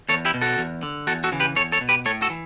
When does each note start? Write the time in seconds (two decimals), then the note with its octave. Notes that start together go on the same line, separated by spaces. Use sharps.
0.09 E2 A4 C#5
0.25 E4 G4
0.34 B2
0.42 F#4 A4
0.58 E2
0.83 D3
1.07 E2 F#4 A4
1.24 F#4 A4
1.32 C#3 E3
1.40 G4 B4
1.56 E2 A4 C#5
1.72 A4 C#5
1.81 B2
1.89 G4 B4
2.06 A2 A4 C#5
2.22 F#4 A4
2.30 E3